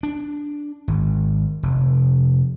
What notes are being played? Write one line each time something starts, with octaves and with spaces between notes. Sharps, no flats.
D4
G#1
F1